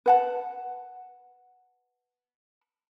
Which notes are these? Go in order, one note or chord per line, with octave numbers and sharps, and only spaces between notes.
B4 F#5 A5